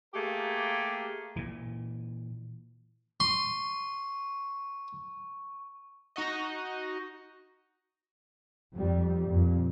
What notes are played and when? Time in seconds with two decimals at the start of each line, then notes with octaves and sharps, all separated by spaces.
0.14 A3 A#3 G4 G#4 A#4
1.36 A#2 E3
3.20 C6 C#6
6.16 D#4 F#4 D#5
8.74 F2 G3
9.29 F2 A#2